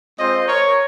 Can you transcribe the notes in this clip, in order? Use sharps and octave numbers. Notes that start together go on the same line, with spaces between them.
G#3 C4 F4 C5 D#5
A#4 C#5